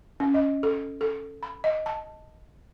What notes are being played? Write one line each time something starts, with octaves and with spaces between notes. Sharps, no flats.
C#4
D#5
A4
A4
B5
D#5
A5